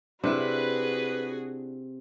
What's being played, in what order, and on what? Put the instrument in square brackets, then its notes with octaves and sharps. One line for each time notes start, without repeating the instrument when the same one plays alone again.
[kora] C3 [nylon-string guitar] D4 E4 [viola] F#4 G#4 [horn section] B4